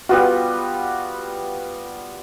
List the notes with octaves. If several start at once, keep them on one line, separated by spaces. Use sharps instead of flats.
G3 B3 F4 F#4